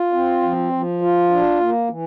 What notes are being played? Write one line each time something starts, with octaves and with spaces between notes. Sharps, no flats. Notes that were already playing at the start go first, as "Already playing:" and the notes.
Already playing: F4
C4
F3
F3
F4
D4
A#3
E3